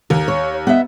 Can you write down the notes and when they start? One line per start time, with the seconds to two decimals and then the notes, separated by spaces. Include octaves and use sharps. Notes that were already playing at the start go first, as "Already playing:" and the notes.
0.10 D#2 A#4
0.28 C#5
0.67 B3 D#5 E5